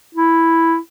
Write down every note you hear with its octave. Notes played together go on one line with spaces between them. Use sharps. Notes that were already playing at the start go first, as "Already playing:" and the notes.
E4